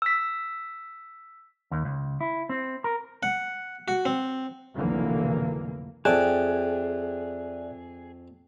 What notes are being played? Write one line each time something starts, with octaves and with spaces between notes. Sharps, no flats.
E6 B6
D#2
C#2
E4
C4
A#4
F#5
F#4
C4
F1 B1 D3 E3 A#3
F2 G#4 D5 E5 G5 A5 F#6